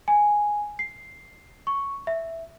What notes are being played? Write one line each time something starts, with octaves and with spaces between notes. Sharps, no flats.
G#5
C7
C#6
E5